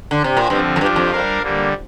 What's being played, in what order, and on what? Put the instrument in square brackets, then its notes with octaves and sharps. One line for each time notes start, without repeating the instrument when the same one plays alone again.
[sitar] D3
C3
A#2
[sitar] G2 [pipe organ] D3 F3 C4
[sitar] F2
[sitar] G2 [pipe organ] F3 D4 G4
[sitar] F2
[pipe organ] G3 D4 A#4 F5
D3 G3 A#3